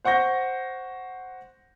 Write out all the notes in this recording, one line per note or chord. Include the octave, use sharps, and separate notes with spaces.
C5 F#5 C#6 G6 A#6